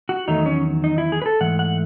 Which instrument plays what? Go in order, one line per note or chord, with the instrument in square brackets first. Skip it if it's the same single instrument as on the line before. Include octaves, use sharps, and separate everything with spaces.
[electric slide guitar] F#4
E2 D#3 F#3 A3 D#4
C#4
D#4
E4
G#4
B4
A4
G#2 E3 A3 F#5
F#5